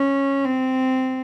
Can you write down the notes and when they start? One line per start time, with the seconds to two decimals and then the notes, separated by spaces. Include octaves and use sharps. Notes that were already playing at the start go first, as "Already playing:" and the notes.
Already playing: C#4
0.45 C4